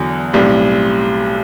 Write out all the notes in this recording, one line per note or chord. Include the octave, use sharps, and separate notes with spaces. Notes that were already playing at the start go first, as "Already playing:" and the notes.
Already playing: E2 D3 F#3
B1 A2 G3 C4